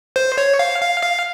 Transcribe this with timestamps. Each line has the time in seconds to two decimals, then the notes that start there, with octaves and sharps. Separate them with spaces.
0.16 C5
0.38 C#5
0.59 F5
0.81 F5
1.03 F5